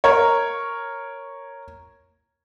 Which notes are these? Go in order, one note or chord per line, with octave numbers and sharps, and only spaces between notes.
A#4 C#5